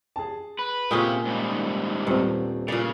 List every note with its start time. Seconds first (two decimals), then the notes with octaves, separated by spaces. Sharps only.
0.16 G#4 A5
0.59 B4
0.91 A#2 C#3 C4 C#4 F4 G4 D#6
1.25 G#2 D#3 G3
2.07 D#1 G2 C4
2.68 A#2 C#3 D5